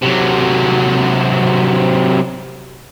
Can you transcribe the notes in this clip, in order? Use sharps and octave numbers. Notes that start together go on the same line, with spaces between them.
C3 F#3